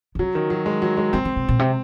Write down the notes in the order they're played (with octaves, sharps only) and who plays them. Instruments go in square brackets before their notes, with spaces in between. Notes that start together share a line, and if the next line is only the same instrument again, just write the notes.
[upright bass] D#3
[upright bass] C#3 [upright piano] F#3
[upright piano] D#3
F#3
G#3
F#3
G#3
[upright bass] D#3 [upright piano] C4
[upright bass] D#3
C3
A#2
C3